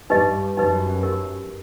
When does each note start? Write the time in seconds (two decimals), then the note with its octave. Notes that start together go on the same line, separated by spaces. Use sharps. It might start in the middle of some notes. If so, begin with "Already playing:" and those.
0.10 G2 D#4 G4 B4 D#5
0.57 F#2 D#4 G4 B4 D#5
1.03 D#4 G4 A#4